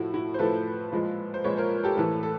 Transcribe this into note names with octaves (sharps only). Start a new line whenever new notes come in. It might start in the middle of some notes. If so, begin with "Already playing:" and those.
Already playing: A2 F3 A3 E4 F#4
E4 F#4
C5
A2 F3 A3 A4 B4
A#2 F3 G#3
C5
A#2 F3 G#3 B4 C#5
A#4 C5
G4 A4
A2 E3 A3 A4 B4
A4